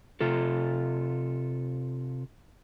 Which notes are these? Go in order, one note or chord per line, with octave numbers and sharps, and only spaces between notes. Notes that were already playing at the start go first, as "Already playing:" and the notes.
C3 F4 A4